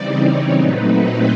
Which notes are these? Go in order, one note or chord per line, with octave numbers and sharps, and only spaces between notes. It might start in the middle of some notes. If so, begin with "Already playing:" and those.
Already playing: C#3 E3 G3 C4 D#4 D5
C#5
A#2 F#3 A3 C4 D#4 B4
B4